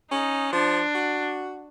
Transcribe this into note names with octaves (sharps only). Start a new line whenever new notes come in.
C#4 D#4
F3 D4
F#4